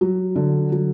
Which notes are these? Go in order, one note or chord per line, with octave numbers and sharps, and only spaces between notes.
F#3
D3
F#3